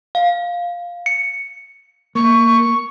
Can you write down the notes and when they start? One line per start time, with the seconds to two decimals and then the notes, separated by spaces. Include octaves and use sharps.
0.15 F5
1.06 C#7
2.15 A#3 C#6